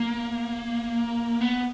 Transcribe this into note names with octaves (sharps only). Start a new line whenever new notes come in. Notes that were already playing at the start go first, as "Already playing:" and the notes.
Already playing: A#3
B3